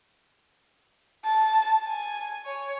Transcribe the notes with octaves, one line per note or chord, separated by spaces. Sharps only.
A5
G#5
C#5